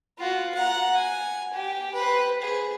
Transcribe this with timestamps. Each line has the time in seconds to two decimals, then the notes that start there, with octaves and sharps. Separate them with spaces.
0.18 F4 F#4
0.54 F#5 A#5
0.95 G#5
1.53 G4
1.94 B4 C5
2.42 G#4